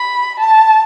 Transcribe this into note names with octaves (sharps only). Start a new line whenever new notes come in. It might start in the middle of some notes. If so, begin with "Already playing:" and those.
Already playing: B5
A5